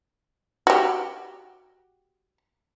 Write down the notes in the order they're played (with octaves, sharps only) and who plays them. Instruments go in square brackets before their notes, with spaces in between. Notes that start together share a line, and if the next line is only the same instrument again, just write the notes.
[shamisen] F#4 G4